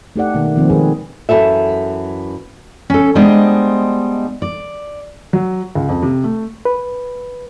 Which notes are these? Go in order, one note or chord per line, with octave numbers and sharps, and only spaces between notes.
A3 D#4 G4 A4 D5 F#5
B2 D#3 A#3
D#3 F3 A#3 C4
D#3 G#3 G#4 B4
F#2 C#3 E3 A4 E5
C#4 A4
G3 G#3 B3 D4 C5 D#5
D5
F#3
C#2
F2
C3
A3
B4